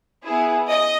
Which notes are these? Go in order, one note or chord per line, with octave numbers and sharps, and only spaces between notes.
B3 E4 G#4
D#5